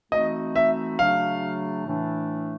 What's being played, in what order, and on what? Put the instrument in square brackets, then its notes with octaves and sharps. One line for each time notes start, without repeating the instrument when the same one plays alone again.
[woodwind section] E3 A3 C4 D#4 F#4 [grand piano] D#5
[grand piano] E5
[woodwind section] C#3 F#3 A3 D4 F#4 [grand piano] F5
[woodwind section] A2 E3 A3 D4